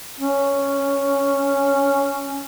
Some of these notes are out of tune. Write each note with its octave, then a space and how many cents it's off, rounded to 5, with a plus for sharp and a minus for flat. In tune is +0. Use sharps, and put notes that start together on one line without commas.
C#4 +0